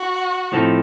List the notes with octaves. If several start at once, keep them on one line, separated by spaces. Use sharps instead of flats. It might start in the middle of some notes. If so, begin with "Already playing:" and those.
Already playing: F#4
A2 F3 C4 D#4 A4